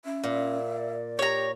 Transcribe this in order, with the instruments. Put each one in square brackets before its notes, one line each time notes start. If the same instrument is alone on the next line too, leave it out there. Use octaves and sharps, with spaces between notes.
[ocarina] C#4 [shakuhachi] E5
[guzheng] A#2
[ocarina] D5
[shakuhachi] G4 [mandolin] C#5 A#5